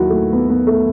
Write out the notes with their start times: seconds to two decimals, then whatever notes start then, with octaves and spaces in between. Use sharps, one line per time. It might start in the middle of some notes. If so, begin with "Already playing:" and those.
Already playing: D#2 D#3 F#3 E4 F#4
0.09 A3
0.33 B3
0.49 B3
0.67 A3